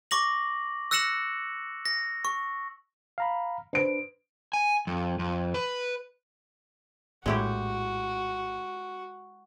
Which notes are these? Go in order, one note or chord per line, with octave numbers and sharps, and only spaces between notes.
C#6 D6 A#6 F#7
E6 F#6 A#6 C#7 E7 F#7
A#6
C#6
F5 A#5 B5
D4 B4 C5 D7
G#5
F2
F2
B4
A#1 A2 G#3 E4 F#4 G4